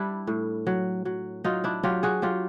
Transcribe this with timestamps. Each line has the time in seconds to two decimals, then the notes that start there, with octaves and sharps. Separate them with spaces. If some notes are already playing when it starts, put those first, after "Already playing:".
Already playing: G3 D4 E4
0.27 A2
0.67 F#3
1.05 F#3
1.44 F#3 D#4 F4
1.64 D4 E4
1.83 F#3 F4 G4
2.03 F#4 G#4
2.22 F#3 F4 G4